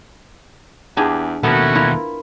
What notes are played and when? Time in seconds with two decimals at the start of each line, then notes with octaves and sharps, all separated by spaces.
0.97 E2 D4 G4 G#4
1.43 D#2 B2 A3 B3 C#4 F#4 A4 A#4
1.75 E4 F4 A#4